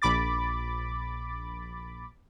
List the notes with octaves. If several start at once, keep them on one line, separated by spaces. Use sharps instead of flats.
A#1 B5 D6 A6